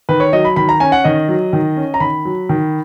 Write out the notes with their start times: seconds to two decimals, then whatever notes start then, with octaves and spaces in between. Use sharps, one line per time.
0.09 D#3 B4
0.20 C#5
0.33 F#3 D#5
0.45 B5
0.56 D#3 B5
0.69 A#5
0.80 C#4 G#5
0.92 F#5
1.04 D#3 D#5
1.29 F#3
1.53 D#3
1.76 C#4
1.94 A#5
2.00 D#3 B5
2.25 F#3
2.49 D#3